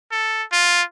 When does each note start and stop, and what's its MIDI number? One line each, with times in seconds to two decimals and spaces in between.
0.11 0.43 69
0.52 0.82 65